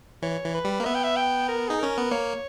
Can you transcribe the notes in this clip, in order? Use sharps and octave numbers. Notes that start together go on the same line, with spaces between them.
E3 C#5
E3
B4
G3
A#3
B3 E5
G5
E5
G5
A#4
D#4 G#4
C#4 A#4
B3
A#3 C#5